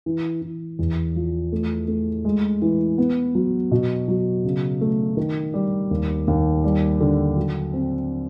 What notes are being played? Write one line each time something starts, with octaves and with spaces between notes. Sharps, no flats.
E3
E3
E2
F3
A3
A3
G#3
E3
B3
F#3
B2
F#3
C#3
A3
D#3
G3
D#2
D#2
G3
D3
F#3
C4